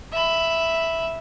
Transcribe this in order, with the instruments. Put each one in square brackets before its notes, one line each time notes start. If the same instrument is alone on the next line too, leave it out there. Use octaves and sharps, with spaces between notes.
[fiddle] E5 B5